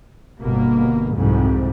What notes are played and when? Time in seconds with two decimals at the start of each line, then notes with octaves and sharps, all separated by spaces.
0.41 G1 B2 A#3
1.14 C2 F2 G#2 C3